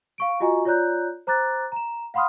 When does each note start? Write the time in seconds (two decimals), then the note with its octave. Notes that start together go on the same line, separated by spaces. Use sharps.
0.18 F5 C#6 D7
0.40 F4 F#4 D#5 G#5 A#5 C#6
0.65 F4 C#5 D5 A#5 F#6 G6
1.27 C5 A#5 D6 F#6 A6
1.72 A#5 E7
2.14 F5 F#5 B5 C6 D#6 F6